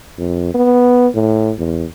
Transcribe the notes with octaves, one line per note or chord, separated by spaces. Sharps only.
F2
B3
A2
E2